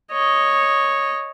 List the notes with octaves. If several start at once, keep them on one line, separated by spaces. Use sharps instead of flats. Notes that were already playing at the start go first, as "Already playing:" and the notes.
C#5 D#5